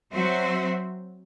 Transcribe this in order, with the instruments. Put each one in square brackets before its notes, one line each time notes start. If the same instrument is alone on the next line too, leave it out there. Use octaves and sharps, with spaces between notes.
[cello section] F#3 C4 F#4 C5 E5